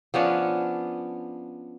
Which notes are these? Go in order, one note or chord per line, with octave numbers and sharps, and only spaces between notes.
F3 B3 C#4 D4